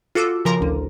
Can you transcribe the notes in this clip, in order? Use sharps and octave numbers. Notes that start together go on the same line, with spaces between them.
F4 F#4 A4 D6 E6
C#3 F3 A#4 A#5 C6 D6
A1 D2